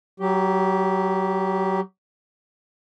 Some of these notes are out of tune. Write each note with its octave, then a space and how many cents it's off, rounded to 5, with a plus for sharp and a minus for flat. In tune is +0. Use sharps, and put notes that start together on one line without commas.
F#3 +25 G4 +0